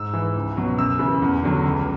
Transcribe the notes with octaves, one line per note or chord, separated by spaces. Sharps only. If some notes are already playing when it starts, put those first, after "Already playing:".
Already playing: G#2 E6
E3
C#2
B2 F#3
F#2 E6
C#3 E3
E2
D3 F#3
C#2